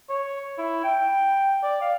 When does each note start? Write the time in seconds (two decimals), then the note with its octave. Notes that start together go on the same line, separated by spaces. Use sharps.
0.10 C#5
0.58 E4
0.84 G5
1.63 D5
1.81 F5